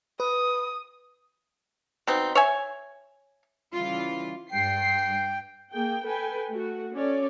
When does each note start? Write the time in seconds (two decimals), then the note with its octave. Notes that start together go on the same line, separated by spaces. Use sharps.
0.20 B4 D#6
2.07 B2 C4 D#4
2.35 C#5 E5 G#5
3.73 C#3 E3 G3 F4
4.51 G2 G5 C7
5.71 A#3 G#4 G5
6.04 A4 B4 G5 G#5
6.50 A3 F#4
6.93 C#4 A4 C#5 D5